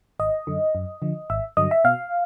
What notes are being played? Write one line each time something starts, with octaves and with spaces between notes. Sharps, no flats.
G#1 D#5
F#2 D3
F#2
D3 F3
G#1 E5
G2 D3 F#3 D#5
E5
B2 F5